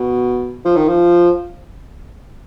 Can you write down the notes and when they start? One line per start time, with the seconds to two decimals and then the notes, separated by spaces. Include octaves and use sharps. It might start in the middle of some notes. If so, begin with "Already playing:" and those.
Already playing: B2
0.65 F3
0.76 D#3
0.88 F3